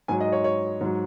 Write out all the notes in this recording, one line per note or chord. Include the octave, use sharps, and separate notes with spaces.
G#2 F#3 G#5
D#5
C#5
C#5
G#2 F#3